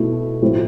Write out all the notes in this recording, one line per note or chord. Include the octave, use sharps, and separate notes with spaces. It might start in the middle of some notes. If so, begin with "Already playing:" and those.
Already playing: B2 A3 E4 A4
A2 F3 C4 E4